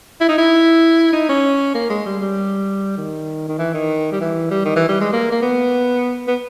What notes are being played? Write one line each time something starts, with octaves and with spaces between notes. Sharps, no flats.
E4
D#4
E4
D#4
C#4
A#3
G#3
G3
G3
D#3
D#3
E3
D#3
G3
E3
G3
D#3
E3
G3
G#3
A#3
A#3
B3
B3